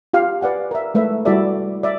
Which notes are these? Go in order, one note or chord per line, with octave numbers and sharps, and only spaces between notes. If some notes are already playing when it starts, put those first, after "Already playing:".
F4 G4 F5
B4 D5 F#5 G#5
A#4 E5
G#3 A3 B4 E5
G3 E4 F#4 A4 D5 E5
D5 E5